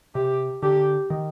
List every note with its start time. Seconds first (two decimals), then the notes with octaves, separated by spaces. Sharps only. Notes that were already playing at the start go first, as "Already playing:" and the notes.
0.15 C3 G4
0.62 D3 G4
1.10 D#3